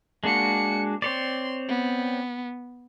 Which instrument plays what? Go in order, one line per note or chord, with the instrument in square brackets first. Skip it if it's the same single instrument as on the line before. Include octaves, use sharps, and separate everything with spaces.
[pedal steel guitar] G#3 D4 F#4 [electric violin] A#3 C#7
[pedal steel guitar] C4 C#5 D5 [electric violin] C6
[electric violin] B3